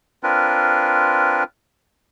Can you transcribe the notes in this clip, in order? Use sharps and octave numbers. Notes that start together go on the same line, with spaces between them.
C4 D4 F4 A#4 B4